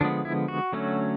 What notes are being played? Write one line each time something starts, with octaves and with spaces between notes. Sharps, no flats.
D3 F3 G#3 B3 D4
E4
F#4
D3 F#3 A3 C#4